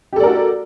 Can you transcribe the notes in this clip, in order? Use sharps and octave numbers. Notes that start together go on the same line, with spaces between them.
F#4 G4 A4 A#4 D5